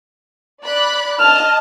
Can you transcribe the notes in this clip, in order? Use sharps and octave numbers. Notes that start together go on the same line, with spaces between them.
D5 B5 F#6
D#5 A5 F6